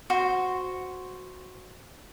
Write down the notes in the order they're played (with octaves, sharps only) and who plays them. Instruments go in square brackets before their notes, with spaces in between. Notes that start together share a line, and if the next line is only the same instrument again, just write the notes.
[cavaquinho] F#4 C5